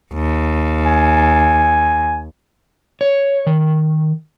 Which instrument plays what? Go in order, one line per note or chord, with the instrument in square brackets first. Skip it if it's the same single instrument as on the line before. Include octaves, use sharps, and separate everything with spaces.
[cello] D#2
[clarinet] G#5
[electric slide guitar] C#5
D#3